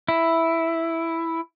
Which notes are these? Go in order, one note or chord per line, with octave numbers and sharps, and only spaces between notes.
E4